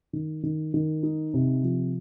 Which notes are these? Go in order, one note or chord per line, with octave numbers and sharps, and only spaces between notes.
D#3
D#3
D#3
D#4
C3
F3